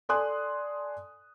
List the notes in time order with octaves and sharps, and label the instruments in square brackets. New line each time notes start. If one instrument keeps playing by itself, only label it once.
[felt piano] A4 D5 G#5 C6 D#6 F#6